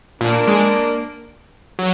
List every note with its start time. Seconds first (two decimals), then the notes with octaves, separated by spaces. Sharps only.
0.21 A#2 A#3 D4
0.47 G#3
1.79 F#3